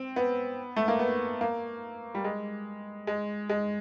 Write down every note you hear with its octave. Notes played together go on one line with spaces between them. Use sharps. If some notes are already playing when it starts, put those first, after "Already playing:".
Already playing: C4
B3
A3
A#3
B3
A#3
G3
G#3
G#3
G#3